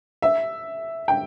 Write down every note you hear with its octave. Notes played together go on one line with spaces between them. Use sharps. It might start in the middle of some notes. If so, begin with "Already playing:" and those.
E5
G5